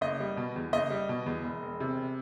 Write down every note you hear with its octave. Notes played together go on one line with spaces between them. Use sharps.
F#1 D#5
G3
B2
E2
F#1 D#5
G3
B2
E2
E1
E1
C3